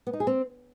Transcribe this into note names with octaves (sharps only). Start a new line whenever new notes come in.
B3
D#4
G#4
C4